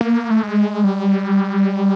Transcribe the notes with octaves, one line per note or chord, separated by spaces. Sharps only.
A#3
A3
G#3
G3